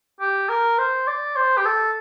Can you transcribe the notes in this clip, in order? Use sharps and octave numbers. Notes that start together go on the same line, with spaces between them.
G4
A#4
C5
D5
C5
G4
A4